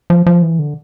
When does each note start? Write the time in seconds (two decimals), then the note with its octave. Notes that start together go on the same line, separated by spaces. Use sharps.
0.10 F3
0.26 F3
0.42 E3
0.59 D3